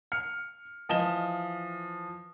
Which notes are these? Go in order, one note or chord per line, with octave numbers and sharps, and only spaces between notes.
F6 C#7
E3 F3 D#5 E7 G7